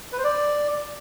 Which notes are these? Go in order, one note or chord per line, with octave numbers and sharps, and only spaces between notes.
B4
C5
D5